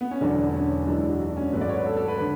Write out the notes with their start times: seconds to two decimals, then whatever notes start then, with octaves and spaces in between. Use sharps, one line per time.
0.01 B3
0.11 C#4
0.21 E1 E2 D3 F#3 D4
0.49 D4
0.54 C#4
0.87 F#2 E3 G#3 D4
0.98 E4
1.09 F#4
1.20 F#4
1.28 D4
1.37 C#4
1.53 G#1 G#2 F#3 A3 B4
1.61 D5
1.69 C#5
1.78 B4
1.86 A4
1.97 A4
2.08 B4
2.18 D3 B4